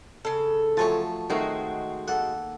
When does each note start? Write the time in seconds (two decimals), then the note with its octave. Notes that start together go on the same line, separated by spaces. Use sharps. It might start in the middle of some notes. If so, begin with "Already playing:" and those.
0.25 C#3 A4
0.77 F3 F#3 A3 C#5 G#5 A5
1.30 D#3 G#3 A3 C4 F#4 A#4
2.08 A#3 A4 F#5